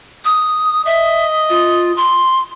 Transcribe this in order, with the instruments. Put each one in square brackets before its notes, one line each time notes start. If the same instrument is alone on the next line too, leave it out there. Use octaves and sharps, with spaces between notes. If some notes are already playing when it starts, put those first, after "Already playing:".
[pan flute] D#6
[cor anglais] D#5 [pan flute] E5
[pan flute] F4
C6